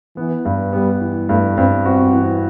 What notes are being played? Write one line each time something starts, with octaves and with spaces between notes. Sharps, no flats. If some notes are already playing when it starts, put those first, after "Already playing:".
E3 B3
G2
G3 B3
E3
G2 A3
G2 C4
C4 F#4
E3